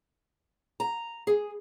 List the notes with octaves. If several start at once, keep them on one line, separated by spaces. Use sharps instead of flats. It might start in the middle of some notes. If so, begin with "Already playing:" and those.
A#5
G#4